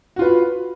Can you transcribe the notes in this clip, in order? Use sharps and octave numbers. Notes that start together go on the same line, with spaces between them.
F4 F#4 B4